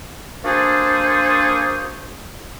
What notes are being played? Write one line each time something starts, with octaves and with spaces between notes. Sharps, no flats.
A#3 D4 F#4 G#4 A4 C5